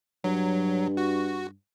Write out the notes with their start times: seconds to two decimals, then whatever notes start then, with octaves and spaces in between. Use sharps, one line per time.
0.24 G2 F#3
0.97 F#4